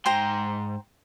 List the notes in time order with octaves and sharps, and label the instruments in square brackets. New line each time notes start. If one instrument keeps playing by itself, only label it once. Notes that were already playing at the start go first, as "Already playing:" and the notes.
[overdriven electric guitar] G#2 C6 [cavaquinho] C5 G5 A#5